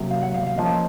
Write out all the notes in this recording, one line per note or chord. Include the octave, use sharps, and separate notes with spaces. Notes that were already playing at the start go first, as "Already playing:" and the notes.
Already playing: C3 F#3 A#3 C#4
F5
F#5
F5
F5
F3 A#3 C#4 D#5